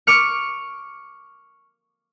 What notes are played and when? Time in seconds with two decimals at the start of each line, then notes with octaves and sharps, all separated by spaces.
0.07 C#6 D6 F6 C#7